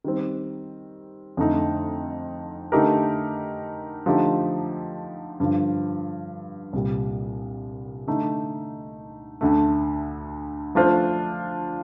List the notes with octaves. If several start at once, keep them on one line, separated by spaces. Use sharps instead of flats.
D#3 G3 C4
F2 D3 A3 D#4
D3 A3 D#4 G4 A#4
D3 F3 A3 D#4 G4
G2 D3 F3
C2 A#2 G3
D3 A3 D#4
D2 D3 A3
F3 A3 D4 F4 C5